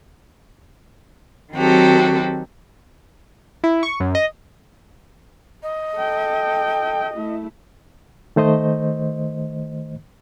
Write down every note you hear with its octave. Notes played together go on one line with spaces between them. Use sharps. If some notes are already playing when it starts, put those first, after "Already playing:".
D#3 F#3 C4 F#4 G4 A4
E4
C#6
F#2
D#5
D#5
A4 G5
A3 E4
D#3 A3 C5 D#5